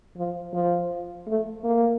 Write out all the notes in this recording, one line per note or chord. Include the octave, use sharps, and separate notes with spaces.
F3
F3
A3
A#3